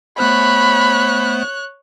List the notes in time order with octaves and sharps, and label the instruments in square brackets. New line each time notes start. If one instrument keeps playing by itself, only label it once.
[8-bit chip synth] A3 B3 C5 [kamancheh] C#5 F#6 [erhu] B5